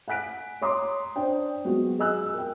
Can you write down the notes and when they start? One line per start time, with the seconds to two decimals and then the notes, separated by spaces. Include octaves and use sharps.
0.08 F#5 G#5 F#6 B6 D7
0.62 C#5 A#5 C6 D6 D#6
1.16 D4 C5 G5
1.65 F#3 G#3 B3 F#4
1.98 G#4 D#5 G#5 E6 F#6
2.34 A#4 G5